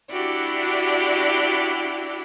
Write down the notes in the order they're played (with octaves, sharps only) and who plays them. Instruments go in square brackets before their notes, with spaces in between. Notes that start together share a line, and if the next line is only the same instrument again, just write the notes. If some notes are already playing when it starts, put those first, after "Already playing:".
[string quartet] D4 E4 F#4 G4 D5